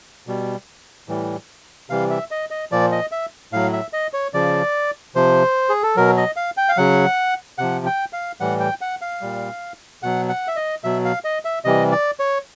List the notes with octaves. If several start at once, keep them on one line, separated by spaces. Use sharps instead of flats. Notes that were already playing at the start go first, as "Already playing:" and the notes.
B2 G3
A2 E3 G3
C3 E3 G3 F5
E5
D#5
D#5
A#2 F3 D5
D#5
E5
A2 F#3 F5
E5
D#5
C#5
C#3 F3 D5
C3 F3 C5
G#4
A4
B2 F#3 A#4
D#5
F5
G5
F5
C#3 F#3 F#5
C3 F3 F#5
G5
F5
A2 E3 G3 F#5
G5
F#5
F5
A#2 G3
B2 F#3 F#5
F#5
E5
D#5
B2 F#3 E5
F5
D#5
E5
C3 E3 G3 D#5
D5
C#5